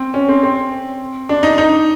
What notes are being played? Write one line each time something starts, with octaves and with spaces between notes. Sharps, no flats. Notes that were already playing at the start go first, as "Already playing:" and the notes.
Already playing: C4
C#4
C4
C4
D4
D#4
D#4